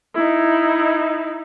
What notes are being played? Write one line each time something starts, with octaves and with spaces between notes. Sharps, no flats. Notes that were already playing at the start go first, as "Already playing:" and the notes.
D#4 E4